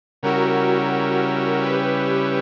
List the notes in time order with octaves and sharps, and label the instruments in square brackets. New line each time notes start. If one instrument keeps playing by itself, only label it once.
[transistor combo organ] C#3 G3 C#4 E4 [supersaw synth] F#4 A#4
[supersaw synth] G4 B4